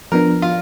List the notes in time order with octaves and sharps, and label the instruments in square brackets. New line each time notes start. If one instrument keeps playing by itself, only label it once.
[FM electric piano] F3 B3 D4 [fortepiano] A#4
[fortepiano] F4